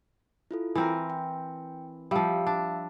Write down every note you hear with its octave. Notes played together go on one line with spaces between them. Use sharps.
E4 F4 A4
E3 C4 A#4
G5
F3 G3 E5 F5 E6
D4